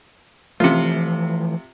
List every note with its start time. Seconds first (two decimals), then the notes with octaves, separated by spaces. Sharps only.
0.60 C3 E3 F3 A3 F4